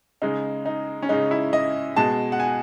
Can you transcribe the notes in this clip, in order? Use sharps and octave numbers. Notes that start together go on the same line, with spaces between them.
C#3 G#3 D#4
D#4
C#4
C#3 G#3 D#4
E4
D#5
B2 G#3 A5
F#5
G#5